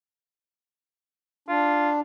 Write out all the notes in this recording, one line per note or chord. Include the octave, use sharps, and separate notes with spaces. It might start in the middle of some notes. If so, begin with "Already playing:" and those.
D4 F4